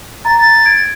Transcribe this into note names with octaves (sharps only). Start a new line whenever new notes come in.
A#5 A6
A6
G#6 D7